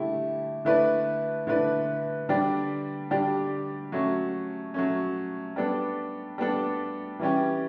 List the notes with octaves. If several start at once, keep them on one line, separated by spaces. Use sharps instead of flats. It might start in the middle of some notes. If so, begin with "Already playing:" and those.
Already playing: D3 A3 E4 G4
D3 A3 E4 B4 D5
D3 A3 E4 B4 D5
D3 G3 D4 G4 D5
D3 G3 D4 G4 D5
F#3 A3 C#4
F#3 A3 C#4
G3 B3 D4 A4
G3 B3 D4 A4
E3 G3 C#4 G4